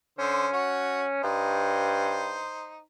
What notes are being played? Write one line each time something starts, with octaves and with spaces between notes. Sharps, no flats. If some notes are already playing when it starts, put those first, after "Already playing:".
D3 C#4 C5
F#4 C#5
G2 D#4 C5